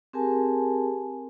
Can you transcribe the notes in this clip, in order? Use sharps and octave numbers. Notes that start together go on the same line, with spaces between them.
C4 G4 G#4 A#4 G#5 A5